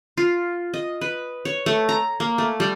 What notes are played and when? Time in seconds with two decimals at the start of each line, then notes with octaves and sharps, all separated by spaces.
0.17 F4
0.74 D#5
1.01 B4
1.45 C#5
1.66 A3
1.89 A#5
2.20 A#3
2.38 A3
2.60 G3